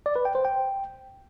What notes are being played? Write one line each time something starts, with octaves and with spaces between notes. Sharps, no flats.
D5
B4
G5
C5
G5